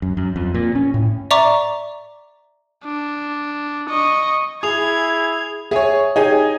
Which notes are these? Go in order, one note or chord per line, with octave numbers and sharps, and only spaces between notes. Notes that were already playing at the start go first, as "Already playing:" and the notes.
F#2
F#2
F2
A#2
C#4
A2
D5 E5 A#5 C#6 D6
D4
D#5 C#6
E4 G#4 D#6 G#6 F7
G#4 C#5 E5 G#5
D#4 G4 G#4 C#5 G#5